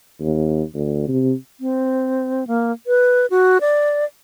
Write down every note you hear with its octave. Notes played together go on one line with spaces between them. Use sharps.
D#2
D2
C3
C4
A#3
B4
F#4
D5